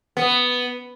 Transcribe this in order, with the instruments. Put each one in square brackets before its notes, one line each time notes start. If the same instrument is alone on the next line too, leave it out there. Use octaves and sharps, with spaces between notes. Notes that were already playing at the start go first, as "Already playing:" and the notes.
[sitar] B3